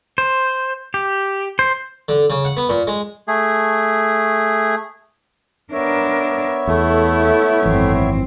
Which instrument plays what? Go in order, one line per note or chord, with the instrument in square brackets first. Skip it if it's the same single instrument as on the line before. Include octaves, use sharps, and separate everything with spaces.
[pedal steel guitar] C5
G4
C5
[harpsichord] D3
C#3
F#5
B3
A#2
G#3
[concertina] A3 G#4
[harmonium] B3 C#5 E5 [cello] D4 A#4
[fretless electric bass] E2 [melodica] A3 [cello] E4 A4
[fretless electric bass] G#1 E3 [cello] F#2 C4